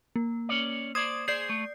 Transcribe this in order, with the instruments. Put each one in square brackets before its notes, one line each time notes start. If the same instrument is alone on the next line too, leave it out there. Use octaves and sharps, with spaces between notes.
[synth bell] A#3
[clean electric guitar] C#4 C#5 D5
[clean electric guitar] C5 D5 [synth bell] D#6 G#6
[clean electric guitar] G#4 C5 [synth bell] D5 G6 C7
[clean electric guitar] A3